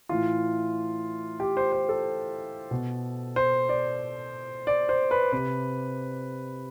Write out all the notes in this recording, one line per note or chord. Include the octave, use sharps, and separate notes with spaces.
A2 E3 F4
G4
C5
C5
A4
B2
C5
D5
D5
C5
B4
C3 B4